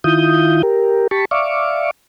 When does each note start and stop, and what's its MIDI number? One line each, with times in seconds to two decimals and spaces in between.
0.04 0.62 51
0.04 0.62 64
0.04 0.62 65
0.04 0.62 87
0.04 0.62 91
0.63 1.08 67
0.63 1.08 70
1.11 1.25 67
1.11 1.25 81
1.11 1.25 83
1.11 1.25 85
1.31 1.91 74
1.31 1.91 76
1.31 1.91 77
1.31 1.91 85
1.31 1.91 86